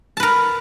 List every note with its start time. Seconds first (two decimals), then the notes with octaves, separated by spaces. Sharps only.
0.17 A5
0.20 B4
0.23 A#4